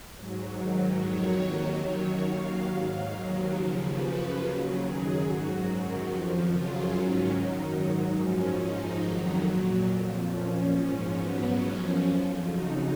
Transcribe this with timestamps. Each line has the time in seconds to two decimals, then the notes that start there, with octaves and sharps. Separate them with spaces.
0.15 G#2 F#3
0.57 G#2 D#3 F#3
0.99 F2 D#3 F#3 C#5
1.41 D#2 D#3 F#3
1.84 F#2 D#3 F#3 C#5
2.26 D#2 D#3 F#3 F5
2.69 G#2 F#3 F5
3.11 D#2 D#3 F#3
3.53 D#2 C#3 F3
3.95 F#2 C#3 F3 B4
4.37 D#2 C#3 F#3
4.80 F#2 D#3 F#3 G#4
5.22 G#2 F#3 F#4
5.65 F#2 D#3 F#3
6.07 F2 F3
6.50 F#2 C#3 F#3 F4
6.92 G#2 D#3 F#3 C#4
7.34 F#2 D#3 F#3 D#4
7.77 G#2 D#3 F#3
8.18 F#2 F3 C#4
8.61 G#2 F3 D#4
9.03 F2 D#3 F#3
9.45 A#2 F#3
9.87 F2 F3
10.30 A#2 F3 C#4
10.73 G#2 F3 C#4
11.14 G#2 F#3 B3
11.57 F#2 F3 C#4
11.99 F2 F3
12.42 F2 C#3 F#3 D#4